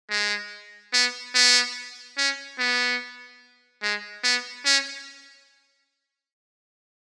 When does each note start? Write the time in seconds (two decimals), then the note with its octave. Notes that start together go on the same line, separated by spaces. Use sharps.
0.10 G#3
0.93 B3
1.35 B3
2.17 C#4
2.59 B3
3.82 G#3
4.24 B3
4.65 C#4